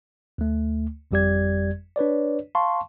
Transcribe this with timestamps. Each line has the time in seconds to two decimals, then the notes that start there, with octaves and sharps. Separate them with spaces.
0.38 D2 A3
1.11 G1 F2 G3 G4 D5 G#6
1.96 D4 B4 C#5 D5
2.55 F5 A5 C6 C#6